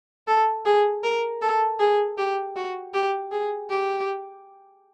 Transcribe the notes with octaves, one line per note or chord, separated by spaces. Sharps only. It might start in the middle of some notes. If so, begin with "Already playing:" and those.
A4
G#4
A#4
A4
G#4
G4
F#4
G4
G#4
G4